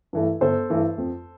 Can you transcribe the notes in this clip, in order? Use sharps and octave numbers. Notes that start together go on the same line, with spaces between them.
G2 E3 A3
G1 A4 C5
G2 E3 A3
F2